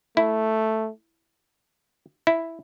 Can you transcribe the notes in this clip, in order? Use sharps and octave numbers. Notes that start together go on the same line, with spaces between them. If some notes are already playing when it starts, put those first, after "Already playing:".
A3 E4
E4